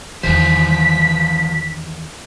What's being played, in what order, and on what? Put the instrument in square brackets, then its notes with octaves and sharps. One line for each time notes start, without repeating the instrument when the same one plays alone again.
[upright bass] E2 D#3 [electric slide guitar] E3 F#3 C5 [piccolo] B6